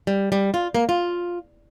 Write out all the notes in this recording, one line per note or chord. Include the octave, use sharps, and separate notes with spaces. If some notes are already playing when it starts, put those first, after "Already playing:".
G3
G3
F4
A#3
F4